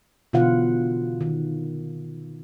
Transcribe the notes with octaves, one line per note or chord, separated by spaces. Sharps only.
B2 D3 E3 F4 F5 F#5
D#3